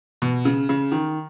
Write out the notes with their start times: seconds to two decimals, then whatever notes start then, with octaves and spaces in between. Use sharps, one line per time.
0.22 B2
0.45 C#3
0.69 C#3
0.92 D#3